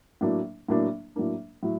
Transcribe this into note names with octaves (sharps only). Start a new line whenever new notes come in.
A2 F#3 A#3 D4
A2 F#3 A#3 D4
A2 F#3 A#3 D4
A2 F#3